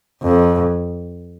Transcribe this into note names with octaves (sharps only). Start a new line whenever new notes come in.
F2